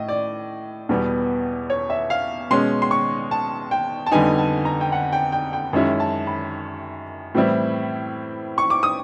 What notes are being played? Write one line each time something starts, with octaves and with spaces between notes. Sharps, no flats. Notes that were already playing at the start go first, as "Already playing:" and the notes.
Already playing: A2 D#5
D5
E2 B2 G3 B3
C#5
E5
F5
B2 G#3 C#4 C6
C6
C#6
A5
G5
A5
F2 D3 G3 B3 D#4 G#5
A5
A#5
G5
F#5
G5
G5
G5
F#2 D#3 G#3 C#4 E4
A5
B5
A2 E3 G3 C4 E4
C#6
D6
D#6